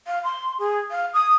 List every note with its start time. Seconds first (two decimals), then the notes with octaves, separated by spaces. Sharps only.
0.07 F5
0.24 C6
0.59 G#4
0.91 F5
1.14 D#6